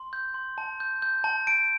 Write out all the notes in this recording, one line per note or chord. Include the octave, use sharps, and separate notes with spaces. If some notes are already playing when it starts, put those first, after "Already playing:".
Already playing: C6
G6
C6
A5
G6
G6
A5
A5 D7